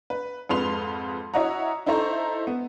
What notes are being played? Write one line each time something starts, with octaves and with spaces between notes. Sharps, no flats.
B4
F2 G#2 F4 B4 C6 F7
E4 F#4 C#5 D#5 F#5 A#5
D#4 E4 A4 C5 A#5 C#6
B3